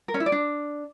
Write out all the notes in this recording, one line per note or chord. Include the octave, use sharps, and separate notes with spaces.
A#4
C#4
E4
D5
D4